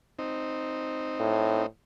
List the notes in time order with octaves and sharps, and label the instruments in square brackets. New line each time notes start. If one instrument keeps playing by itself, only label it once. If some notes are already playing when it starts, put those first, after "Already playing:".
[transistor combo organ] C4 D#4
[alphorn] A2